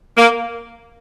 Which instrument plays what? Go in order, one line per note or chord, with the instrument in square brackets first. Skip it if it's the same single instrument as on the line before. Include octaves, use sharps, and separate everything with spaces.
[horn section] A#3